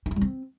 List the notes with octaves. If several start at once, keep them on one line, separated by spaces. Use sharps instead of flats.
D#4
E4
G3
C4